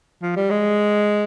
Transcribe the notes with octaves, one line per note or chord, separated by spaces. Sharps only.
F3
G3
G#3